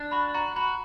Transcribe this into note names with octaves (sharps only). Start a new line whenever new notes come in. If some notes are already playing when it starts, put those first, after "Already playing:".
Already playing: D4
F#4 B5
F#4 A#5
F#4 B5